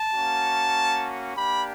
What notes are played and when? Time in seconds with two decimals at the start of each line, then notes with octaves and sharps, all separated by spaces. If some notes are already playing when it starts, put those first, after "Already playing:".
Already playing: A5
0.13 A#3 C#4 F#4
1.36 A#3 D4 G4 B5